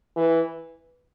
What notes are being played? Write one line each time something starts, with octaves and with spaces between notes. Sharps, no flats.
E3